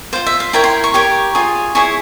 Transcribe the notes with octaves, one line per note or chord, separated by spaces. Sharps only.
F4 C5 F5
E5
F5
E4 A#4 C#5 G5
C6
C#6
G4 A#4 C#5
F4 G#4 C#5
E4 G#4 C#5 C#6